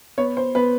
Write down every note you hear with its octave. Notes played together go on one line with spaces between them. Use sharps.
B3 C#5
C5
B3 B4